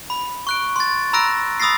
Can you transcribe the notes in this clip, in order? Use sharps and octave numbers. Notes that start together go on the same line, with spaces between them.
B5
C#6 F#6 D7
C6 A6
A#5 B5 E6 F#6 A#6 D7
B5 D#6 E6 A6 A#6 C7